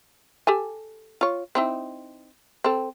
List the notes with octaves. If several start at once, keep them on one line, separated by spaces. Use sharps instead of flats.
G4 A4 G#5
F4 C#5
C4 D#4 E4
C4 A4